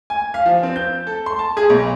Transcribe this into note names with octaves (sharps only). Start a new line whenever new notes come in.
G#5
F5
F3
C4
G6
A4
C6
A5
G#4
B1